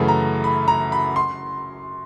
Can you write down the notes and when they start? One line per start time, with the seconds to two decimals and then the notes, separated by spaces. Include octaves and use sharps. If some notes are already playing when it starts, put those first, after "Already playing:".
Already playing: F#2 C#3 E3 A3 B5
0.08 A#5
0.44 B5
0.68 A#5
0.92 B5
1.16 C6